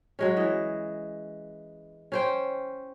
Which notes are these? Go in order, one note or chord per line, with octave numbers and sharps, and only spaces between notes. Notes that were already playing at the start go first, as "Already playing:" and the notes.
F#3 G#3 C#4
E3 D#5
C#4 C5 G5